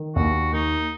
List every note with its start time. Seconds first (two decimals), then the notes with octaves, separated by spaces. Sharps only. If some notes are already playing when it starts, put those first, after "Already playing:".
Already playing: D#3
0.16 D#2 F#4
0.53 A#3 D#4